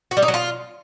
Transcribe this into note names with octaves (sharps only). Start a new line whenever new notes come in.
F#4
G3
D#4
F#3
F4